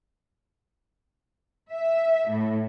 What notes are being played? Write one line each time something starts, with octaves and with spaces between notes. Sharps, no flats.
E5
A2